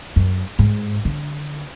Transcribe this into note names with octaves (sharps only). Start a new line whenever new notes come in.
F#2
G#2
D3